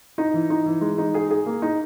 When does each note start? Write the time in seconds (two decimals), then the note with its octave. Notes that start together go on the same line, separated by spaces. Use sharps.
0.18 D#4
0.34 E3
0.50 D#4
0.66 E3
0.81 G#3
0.98 D#4
1.14 G#4
1.31 G#4
1.46 A#3
1.62 D#4